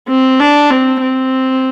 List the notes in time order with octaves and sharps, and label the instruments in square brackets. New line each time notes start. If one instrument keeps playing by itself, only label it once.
[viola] C4
D4
C4
C4